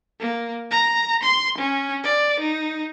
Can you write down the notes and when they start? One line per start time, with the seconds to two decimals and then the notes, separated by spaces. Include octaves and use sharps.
0.20 A#3
0.71 A#5
1.23 C6
1.58 C#4
2.04 D5
2.40 D#4